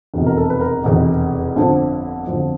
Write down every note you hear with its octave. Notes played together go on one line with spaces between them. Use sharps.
F1 E2 B2
A#4
A4
B4
A#4
F1 E2 B2
G1 F2 D3 F3
G1 F2 D3 F3